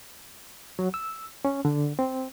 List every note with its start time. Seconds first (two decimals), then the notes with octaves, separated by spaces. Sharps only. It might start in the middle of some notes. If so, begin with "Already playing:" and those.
0.79 F#3
0.94 E6
1.45 C#4
1.65 D3
1.99 C4